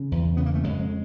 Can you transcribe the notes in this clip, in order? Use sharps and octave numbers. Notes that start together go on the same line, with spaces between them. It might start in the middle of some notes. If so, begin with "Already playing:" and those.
Already playing: C#3
E2
C#3 B3
A#3
A3
F2 G#3